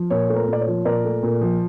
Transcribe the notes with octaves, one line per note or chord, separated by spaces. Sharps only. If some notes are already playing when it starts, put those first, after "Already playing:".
Already playing: F3
A#2 C#5
A3
A#4
A#2 D5
C#5
F3
A#2 A#4 D5
A3
A#2
F3